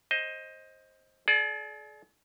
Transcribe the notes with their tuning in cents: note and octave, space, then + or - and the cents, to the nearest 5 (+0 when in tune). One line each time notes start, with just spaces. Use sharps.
C5 +20 D#5 +10
G#4 +45 D5 +0